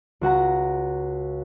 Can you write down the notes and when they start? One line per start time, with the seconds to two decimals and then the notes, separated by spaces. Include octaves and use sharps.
0.21 C#2 F#4 F#5 A#5